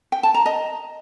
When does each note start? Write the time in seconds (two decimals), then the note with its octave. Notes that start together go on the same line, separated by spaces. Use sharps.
0.12 G5
0.23 A5
0.34 A#5
0.46 D#5